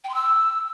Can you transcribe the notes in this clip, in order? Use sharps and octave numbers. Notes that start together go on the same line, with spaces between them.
G5
C6
E6